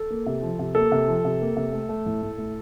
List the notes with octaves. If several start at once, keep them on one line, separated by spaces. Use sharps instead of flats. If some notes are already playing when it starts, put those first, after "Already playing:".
Already playing: A4
A#3
C3
F3
C3
A#3 A4
C3
F3
C3
A#3
C3
A3
A3
A2
A2
A3